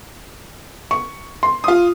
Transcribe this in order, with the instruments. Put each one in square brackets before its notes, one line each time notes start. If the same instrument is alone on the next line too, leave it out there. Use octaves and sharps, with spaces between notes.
[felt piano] C#6
C6
[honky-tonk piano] F4 D#6